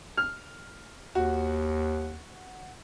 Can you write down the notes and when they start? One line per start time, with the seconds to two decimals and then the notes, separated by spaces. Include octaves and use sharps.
0.17 F6
1.15 D#2 F#4